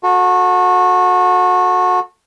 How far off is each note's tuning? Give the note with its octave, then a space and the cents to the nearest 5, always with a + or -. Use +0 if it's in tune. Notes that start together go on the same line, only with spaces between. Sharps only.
F#4 -25 A4 +10